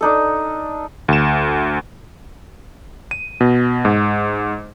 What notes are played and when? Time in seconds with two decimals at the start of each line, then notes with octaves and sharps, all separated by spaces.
0.01 D4 D#4 A4
1.08 D2 E7
3.11 D#7
3.41 B2
3.85 G#2